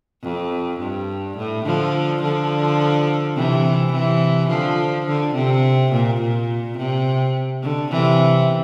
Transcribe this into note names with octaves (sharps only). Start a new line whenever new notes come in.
F2
G2
A2
D3 F3
D3 F3
C3 E3
C3 E3
D3 F3
D3
C3
A#2
A#2
C3
D3
C3 E3